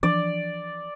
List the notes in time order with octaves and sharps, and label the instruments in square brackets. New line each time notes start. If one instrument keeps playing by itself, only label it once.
[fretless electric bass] E3 F3 D4 [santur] D5